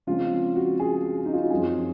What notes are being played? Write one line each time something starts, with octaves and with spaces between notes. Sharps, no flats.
C#3 F3 G#3 C4 F4
F#4
G#4
G#4
D#4
F4
F#4
F#2 F3 C4 G#4